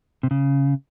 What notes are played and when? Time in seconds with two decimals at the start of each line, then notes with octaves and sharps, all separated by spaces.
0.23 C3
0.31 C#3